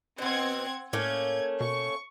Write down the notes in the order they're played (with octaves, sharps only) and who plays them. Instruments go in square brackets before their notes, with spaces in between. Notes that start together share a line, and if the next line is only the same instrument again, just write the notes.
[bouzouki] B2 B3 [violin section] C4 F#5 G#6
[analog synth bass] A2 [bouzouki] A3 A#3 C#4 [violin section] G6 G#6
[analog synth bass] B2 [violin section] C#6